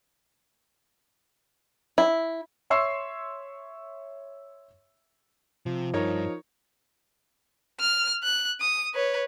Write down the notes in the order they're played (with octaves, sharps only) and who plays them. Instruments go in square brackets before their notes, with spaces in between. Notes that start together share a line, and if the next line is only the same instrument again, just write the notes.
[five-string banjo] E4
[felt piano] C#5 E5 C6 C#6 E6 C7
[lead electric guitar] C3 [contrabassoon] F3
[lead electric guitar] G2 [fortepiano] D#4 A#4 C#5
[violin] F6
F#6
D#6
B4 C#5